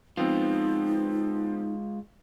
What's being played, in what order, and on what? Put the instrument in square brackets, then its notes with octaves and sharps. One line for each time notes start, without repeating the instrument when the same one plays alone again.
[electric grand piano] F3 B3 C4 [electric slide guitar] G#3 F4 [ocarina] D#4